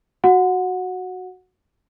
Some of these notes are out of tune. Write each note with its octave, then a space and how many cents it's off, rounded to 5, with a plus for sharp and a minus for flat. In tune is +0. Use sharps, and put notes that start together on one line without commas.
F#4 +0 F#5 -15